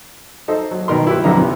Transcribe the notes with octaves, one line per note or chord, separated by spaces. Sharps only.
D#4 A4 C5 D#5
F#3
B2 D#3 A#4 C6
E4 G4 B4
B1 F2 D3 D#5 A#5
C3 B3